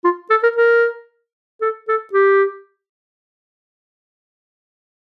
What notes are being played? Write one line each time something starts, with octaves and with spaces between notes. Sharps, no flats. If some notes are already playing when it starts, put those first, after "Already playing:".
F4
A4
A#4
A#4
A4
A4
G4